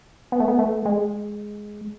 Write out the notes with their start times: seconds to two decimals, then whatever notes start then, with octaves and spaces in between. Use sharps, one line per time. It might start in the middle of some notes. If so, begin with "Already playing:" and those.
0.32 B3
0.40 A3
0.48 B3
0.59 A3
0.85 G#3